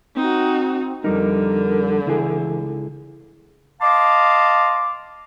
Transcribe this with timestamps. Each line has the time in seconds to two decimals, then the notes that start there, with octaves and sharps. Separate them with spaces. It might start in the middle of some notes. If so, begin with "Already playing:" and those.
0.16 C4 D#4 F#4
1.04 F2 D3 G3 D#4 A#4
2.06 C#2 E3 E4 G#4
3.81 D#5 F5 A5 C6 D6